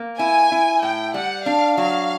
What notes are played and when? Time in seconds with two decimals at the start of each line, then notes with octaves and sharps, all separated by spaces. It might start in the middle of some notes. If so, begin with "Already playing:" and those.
Already playing: A#3
0.19 E4 G#5
0.52 E4
0.82 A2 G5
1.14 G3 F#5
1.46 D4 F5
1.77 F#3 F5